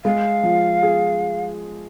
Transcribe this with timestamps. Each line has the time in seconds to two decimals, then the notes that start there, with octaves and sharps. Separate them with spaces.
0.04 G#3 F5
0.43 F3
0.83 G#4